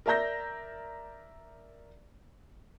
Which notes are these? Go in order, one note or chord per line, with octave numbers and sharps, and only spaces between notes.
A#4 D5 E5 A#5 G6 A#6